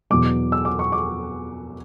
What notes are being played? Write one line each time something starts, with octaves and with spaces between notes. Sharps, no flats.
E2 B2 F#3 D6
E6
D6
C#6
D6